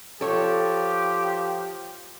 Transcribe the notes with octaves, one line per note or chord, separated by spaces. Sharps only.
F3 G4 A4 C#5